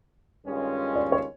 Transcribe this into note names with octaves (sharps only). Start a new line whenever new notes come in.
G2 D#3 G#3 C#4 F4
D5
C#5